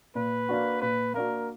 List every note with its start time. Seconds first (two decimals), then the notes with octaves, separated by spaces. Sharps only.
0.15 A#2 B4
0.49 A#3 D4 F#4
0.82 A#2 B4
1.14 A#3 D4 F#4 A#4